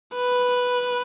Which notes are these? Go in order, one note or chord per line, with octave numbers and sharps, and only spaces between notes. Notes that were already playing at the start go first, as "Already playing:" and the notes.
B4